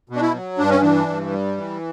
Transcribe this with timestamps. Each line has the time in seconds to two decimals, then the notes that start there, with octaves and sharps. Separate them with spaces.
0.09 B2
0.16 D4
0.22 E4
0.34 F#3
0.58 G2 D4
0.70 C#4
0.81 E3 D4
1.07 G2
1.32 G3
1.57 E3